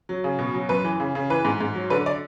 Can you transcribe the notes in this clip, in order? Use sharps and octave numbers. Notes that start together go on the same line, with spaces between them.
F#3
C#3
B2
F#3
F#2 B4
E3
C#3
C#3
E3 B4
G#2
G#2
F#3
D3 B4
D5